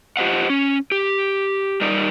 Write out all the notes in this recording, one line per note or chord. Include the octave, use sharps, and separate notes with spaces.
F4 G4 C5 D#5 F#5
C#4
G4
G3 D#4 A#4 D5